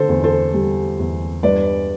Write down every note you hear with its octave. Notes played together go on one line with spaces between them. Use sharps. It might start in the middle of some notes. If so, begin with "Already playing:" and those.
Already playing: D3 A4 C5
E2
A4 C5
G3
E2
G2 B4 D5